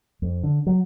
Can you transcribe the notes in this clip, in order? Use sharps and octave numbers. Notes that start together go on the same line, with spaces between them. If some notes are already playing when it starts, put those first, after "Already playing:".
F2
D3
F#3